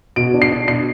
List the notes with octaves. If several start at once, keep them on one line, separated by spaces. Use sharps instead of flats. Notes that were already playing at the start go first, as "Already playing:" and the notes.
B2 D7
D4
C7
D4
B2 C7